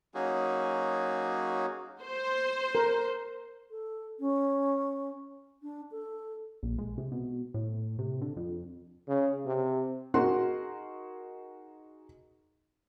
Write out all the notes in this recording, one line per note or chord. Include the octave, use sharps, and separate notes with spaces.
F#3 A#3 C#4 D#4 F#4 G#4
C5
A#4
A4
C#4
D4
A4
A#1
G#3
C3
B2
A2
C3
D3
F2
C#3
C3
D#4 F#4 G#4 A#4 F#5 C6